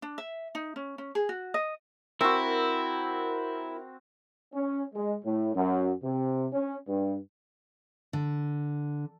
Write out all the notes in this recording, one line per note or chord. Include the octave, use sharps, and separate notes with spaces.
D4
E5
D#4
C#4
C#4
G#4
F#4
D#5
C4 E4 F#4 A#4
C#4
G#3
A2
F#2
C3
C#4
G2
D3